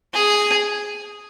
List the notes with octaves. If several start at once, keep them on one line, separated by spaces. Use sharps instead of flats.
G#4